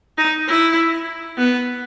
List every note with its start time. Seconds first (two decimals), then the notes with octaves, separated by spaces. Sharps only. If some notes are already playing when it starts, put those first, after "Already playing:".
0.17 D#4
0.47 E4
1.38 B3